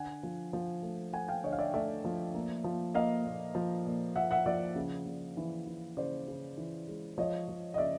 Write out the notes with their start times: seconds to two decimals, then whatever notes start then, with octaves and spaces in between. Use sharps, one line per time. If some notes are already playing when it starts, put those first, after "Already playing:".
Already playing: D3 F#5 G#5
0.23 F3
0.53 F3
0.83 A3
1.13 A3 F#5 G#5
1.28 F5 G5
1.44 D3 C#5 D#5
1.53 F5
1.59 D5 E5
1.74 A3 D5 E5
2.05 F3
2.34 A#3
2.64 F3
2.94 A#3 D#5 F5
3.25 A#2
3.55 F3
3.86 A#2
4.16 F3 E5 F#5
4.31 E5 F#5
4.46 F3 D5 E5
4.76 C#3
5.06 C#3
5.37 E3
5.67 E3
5.97 C#3 C5 D5
6.28 C#3
6.58 E3
6.88 G#3
7.18 F3 C#5 D#5
7.48 F3
7.74 D#5
7.78 C#3 D5 E5